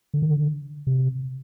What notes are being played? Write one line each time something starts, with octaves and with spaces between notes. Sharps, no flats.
D3
D#3
D3
C3